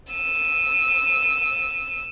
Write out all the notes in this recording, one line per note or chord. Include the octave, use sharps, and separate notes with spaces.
E6 D#7